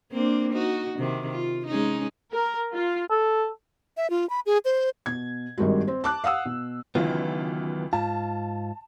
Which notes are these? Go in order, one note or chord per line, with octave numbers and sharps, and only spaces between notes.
A#3 C4 D4
D#4 F#4
C3 D#3
F4
G#3 C#4 D#4
A#4
F4
A4
E5
F4
B5
G#4
C5
B2 G#6
G#1 G2 D#3 G3 G#3 F#4
C4
A5 D6 F#6
F5 F#5 D#6 E6
B2
C#2 D#3 E3 F#3 B3 F4
G#2 F4 A5